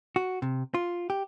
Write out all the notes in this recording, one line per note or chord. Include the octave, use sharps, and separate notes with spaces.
F#4
C3
F4
G4